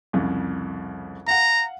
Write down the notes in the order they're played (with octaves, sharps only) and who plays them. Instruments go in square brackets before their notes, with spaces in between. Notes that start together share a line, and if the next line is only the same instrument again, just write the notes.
[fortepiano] C2 F2 C#3
[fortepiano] F5 F#5 [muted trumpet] A#5